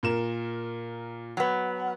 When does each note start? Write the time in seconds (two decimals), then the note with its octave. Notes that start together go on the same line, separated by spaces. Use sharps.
0.03 A#2 A#4 E7
1.37 F#3 B3